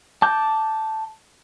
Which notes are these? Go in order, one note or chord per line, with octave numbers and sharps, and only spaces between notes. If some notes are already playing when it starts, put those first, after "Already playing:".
A5 D6 G6